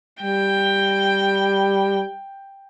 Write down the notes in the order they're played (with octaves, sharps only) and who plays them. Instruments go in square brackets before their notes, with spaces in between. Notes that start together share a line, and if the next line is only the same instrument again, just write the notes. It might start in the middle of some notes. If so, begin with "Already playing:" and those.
[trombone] G3 [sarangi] G5